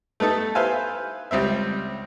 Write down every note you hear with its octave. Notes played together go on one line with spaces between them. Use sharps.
A3 B3 D#4 A4
B4 C5 E5 F5 G#5
C#2 G3 C4 E5